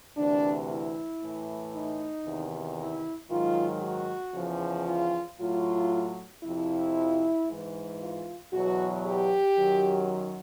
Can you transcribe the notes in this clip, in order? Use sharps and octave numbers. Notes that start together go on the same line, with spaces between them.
D2 C3 E3 D4
E4
A2 E3
D#4
E2 C3 D#3
E4
G#2 D#3 F#3 F4
F#4
E2 C#3 F3
F4
A2 F#3 F4
F2 C3 F3 E4
G#2 E3
F4
E2 B2 F#3 F#4
G4
F#2 D#3 F#3